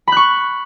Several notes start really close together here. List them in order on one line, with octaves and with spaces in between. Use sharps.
B5 F#6 C#6